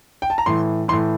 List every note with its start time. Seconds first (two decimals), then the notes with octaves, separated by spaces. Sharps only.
0.22 G5
0.30 A5
0.38 A#5
0.46 A2 E3 C6
0.88 E3 C6
0.93 A2